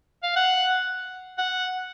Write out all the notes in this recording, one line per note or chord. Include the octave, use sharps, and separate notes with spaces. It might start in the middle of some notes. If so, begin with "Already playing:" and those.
F5
F#5
F#5